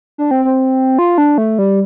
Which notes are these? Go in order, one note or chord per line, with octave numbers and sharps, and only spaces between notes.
D4
C4
C4
F4
D4
A3
G3